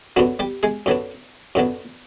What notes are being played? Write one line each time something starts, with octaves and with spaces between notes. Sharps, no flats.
F#2 D3 F#3 B3 D4 F#4
G3 G4
G#3 G#4
F#2 D3 F#3 B3 D4
F#2 D3 F#3 B3 D4